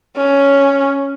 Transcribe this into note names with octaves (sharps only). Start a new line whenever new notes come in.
C#4